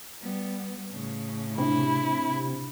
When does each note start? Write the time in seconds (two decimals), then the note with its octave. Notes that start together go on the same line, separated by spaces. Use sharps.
0.22 G3 B3
0.90 A2 C#3
1.58 C3 D4 E4